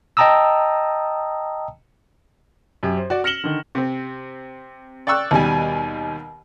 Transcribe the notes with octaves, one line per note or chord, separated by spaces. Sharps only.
D#5 G5 A5 A#5 D#6 E6
F#2 G4
C5
F#4 D5
F6 A#6 C#7 E7 F#7 G7
D3 D#3
C3 C4
D5 G5 C#6 E6 F#6
D#2 B2 G3 G#5